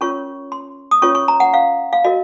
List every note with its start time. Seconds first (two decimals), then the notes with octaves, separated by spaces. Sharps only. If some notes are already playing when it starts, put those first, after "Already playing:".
0.01 C#4 F4 A#4 C#5 C#6
0.52 C6
0.91 D#6
1.02 C#4 F4 A#4 C#5 C#6
1.15 C#6
1.28 A#5
1.40 F#5
1.54 F5
1.93 F5
2.05 F#4 A#4 D#5